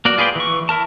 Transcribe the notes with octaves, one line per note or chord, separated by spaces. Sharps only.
A#3 F#4 D5
F4 G#4 B4 D5 G5
E3 C#6
E4 A#4 A5